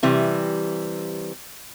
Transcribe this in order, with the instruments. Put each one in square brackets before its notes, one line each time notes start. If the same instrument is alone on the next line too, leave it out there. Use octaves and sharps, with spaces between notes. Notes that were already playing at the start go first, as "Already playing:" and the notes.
[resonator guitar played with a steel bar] C3 E3 G3